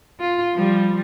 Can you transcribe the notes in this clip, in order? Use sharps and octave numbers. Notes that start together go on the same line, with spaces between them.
F4
F3 G3